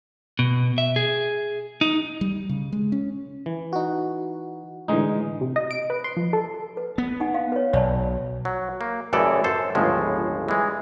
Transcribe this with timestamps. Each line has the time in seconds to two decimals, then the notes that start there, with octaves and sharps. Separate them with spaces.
0.39 B2
0.78 E5
0.96 G#4
1.81 D#4
2.21 G3
2.49 C#3
2.72 G#3
2.92 C#4
3.46 E3
3.73 D#4 F#4
4.88 A2 D3 E3 G#3 D#4
5.41 C3
5.56 D#5
5.71 D7
5.90 B4
6.04 C6
6.17 F3
6.33 A4
6.77 B4
6.98 B3
7.20 D#4 F#5 G#5
7.34 F5
7.52 B4 C#5
7.73 B1 C#5 D5 A5
8.45 F#3
8.81 A#3
9.13 A1 F#2 C#3 E3 A4 D5
9.44 F#2 A4 C5
9.75 G1 C#2 A2 F3 G#3
10.48 E3 G#3